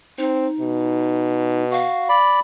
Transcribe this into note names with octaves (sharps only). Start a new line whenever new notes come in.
C4 D#4
B2
F#4 F5
D5 B5